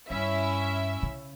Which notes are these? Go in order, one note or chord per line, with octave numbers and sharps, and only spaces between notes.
G2 C#4 E4 E5
C#3